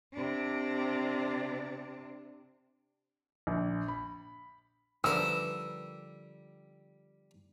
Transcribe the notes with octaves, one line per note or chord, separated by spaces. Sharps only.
C3 D4
A#1
B5
D3 F3 G3 B3 A#4 E6